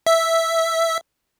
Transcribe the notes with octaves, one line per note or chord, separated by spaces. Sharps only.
E5